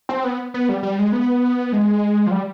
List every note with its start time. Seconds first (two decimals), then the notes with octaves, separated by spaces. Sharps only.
0.09 C4
0.24 B3
0.54 B3
0.69 G3
0.83 G3
0.99 G#3
1.12 B3
1.73 G#3
2.27 F3
2.31 G3